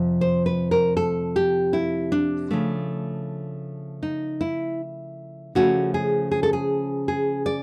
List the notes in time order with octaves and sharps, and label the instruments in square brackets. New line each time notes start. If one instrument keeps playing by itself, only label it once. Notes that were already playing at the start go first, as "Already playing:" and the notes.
Already playing: [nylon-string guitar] F2 C3 F3
C5
B4
A#4
A4
G4
E4
D4
C#3 F3 A3
D#4
E4
C#3 F3 A3 C#4 F#4
G#4
G#4
A4
G#4
G#4
D5